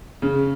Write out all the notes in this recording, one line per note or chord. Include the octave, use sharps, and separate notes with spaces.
C#3